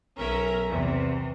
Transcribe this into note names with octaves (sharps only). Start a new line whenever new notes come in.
B1 C#4 A#4 E5
E2 C3 E3